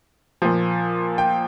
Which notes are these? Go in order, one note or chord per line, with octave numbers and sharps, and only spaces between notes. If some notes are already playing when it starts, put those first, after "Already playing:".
A#2 F3
G5